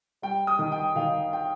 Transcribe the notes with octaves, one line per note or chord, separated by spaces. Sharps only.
G3 G5
D#6
D#3
G5
D#3 F5
G5